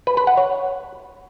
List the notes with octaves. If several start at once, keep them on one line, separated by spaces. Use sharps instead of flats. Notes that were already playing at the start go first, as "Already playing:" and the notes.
B4
B4
F#5
C#5